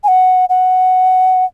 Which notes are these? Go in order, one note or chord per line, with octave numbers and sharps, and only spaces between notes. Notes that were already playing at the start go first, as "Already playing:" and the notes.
G#5
F#5
F#5